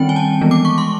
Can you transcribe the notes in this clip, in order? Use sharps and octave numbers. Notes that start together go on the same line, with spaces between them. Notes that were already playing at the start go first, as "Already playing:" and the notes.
Already playing: D#3 G3 C4 G5
G#5
A5
E3 G#3 B3
D6
C#6
C6